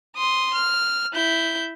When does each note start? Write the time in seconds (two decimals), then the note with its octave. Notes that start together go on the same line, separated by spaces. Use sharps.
0.16 C6 D#6
0.54 F6
1.14 E4 G6